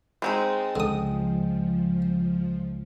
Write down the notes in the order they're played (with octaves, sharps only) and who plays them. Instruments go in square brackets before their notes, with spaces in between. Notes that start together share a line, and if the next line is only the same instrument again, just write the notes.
[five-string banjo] G#3 C4 D#4 [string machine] A5 D#6
[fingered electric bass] C#2 [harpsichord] D3 D#6 [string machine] F3